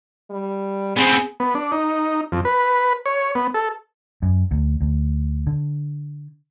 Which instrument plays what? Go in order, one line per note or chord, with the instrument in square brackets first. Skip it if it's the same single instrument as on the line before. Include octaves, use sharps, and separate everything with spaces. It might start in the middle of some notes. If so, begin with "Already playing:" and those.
[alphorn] G3
[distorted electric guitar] B3 C4 [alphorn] G#4
[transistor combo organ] B3
D4
D#4
F2
B4
C#5
B3
A4
[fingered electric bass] F#2
D2
D2
D3